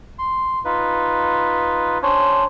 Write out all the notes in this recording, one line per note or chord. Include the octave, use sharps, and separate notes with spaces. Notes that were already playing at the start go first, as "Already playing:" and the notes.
C6
D#4 F4 B4
C#4 D4 C5 C#5